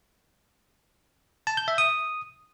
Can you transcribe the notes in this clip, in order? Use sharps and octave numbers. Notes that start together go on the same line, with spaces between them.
A5
G6
E5
D#6